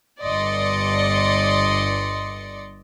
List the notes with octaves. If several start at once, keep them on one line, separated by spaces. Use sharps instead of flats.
G1 D5 D#5 C6 C#7